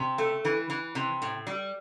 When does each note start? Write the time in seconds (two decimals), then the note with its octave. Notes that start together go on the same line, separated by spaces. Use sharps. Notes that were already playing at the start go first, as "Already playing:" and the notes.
Already playing: C3
0.18 A3
0.45 E3
0.70 E3
0.95 C3
1.22 A2
1.47 G3